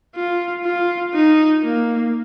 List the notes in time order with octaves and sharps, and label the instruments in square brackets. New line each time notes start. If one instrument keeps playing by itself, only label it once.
[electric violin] F4
F4
D#4
A#3